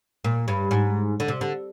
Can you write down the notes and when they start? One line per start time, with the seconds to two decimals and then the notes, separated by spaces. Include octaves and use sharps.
0.25 A#2
0.48 G2
0.71 G#2
1.20 D3
1.28 C3
1.41 D3